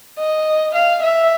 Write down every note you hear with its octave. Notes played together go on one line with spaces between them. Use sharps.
D#5
F5
E5